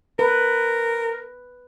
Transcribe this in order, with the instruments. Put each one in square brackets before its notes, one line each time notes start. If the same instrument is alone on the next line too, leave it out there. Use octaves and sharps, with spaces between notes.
[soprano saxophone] A#4 [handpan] B4